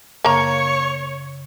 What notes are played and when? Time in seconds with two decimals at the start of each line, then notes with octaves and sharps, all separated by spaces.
0.25 F#2 C#3 A#3 C#5 A#5 C#6